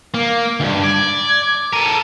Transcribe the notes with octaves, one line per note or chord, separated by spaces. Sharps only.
A#3
D2 G2
D5 G#6
A4 A#4 D#7